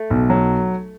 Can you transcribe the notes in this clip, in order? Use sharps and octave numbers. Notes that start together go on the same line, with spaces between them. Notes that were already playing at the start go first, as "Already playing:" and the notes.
Already playing: A3
B1
F#3